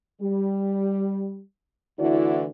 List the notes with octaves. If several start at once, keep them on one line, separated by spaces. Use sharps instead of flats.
G3
D2 D3 E3 E4 F#4 D5